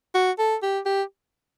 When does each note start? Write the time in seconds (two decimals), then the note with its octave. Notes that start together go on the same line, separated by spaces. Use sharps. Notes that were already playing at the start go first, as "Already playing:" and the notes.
0.15 F#4
0.39 A4
0.63 G4
0.86 G4